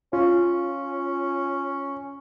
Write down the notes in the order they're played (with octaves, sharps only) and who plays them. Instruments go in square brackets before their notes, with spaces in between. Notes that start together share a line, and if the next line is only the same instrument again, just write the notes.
[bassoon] C#4 [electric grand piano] F4